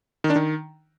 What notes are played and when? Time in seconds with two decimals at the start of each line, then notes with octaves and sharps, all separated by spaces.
0.24 D#3
0.30 D4
0.36 D#3